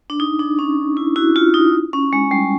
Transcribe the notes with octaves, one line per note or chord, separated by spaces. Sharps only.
D4
D#4
D4
C#4
E4
E4 F#4
F4
D#4
C#4
G#3
G3